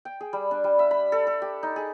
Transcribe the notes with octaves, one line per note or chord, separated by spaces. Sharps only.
G5
G#4
G3
D4
G3
E5
B5
A4
A4
G4
D#4
G#4